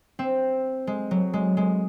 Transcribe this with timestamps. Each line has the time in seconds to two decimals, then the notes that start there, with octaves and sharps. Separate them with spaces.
0.19 C4
0.87 G#3
1.11 F#3
1.33 G#3
1.57 G#3